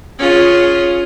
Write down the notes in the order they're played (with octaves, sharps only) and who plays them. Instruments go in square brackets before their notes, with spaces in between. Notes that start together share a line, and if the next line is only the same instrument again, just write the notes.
[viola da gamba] C#4 F4 G#4